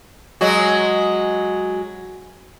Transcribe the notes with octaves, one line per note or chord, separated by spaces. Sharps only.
F#3 G#3 F#4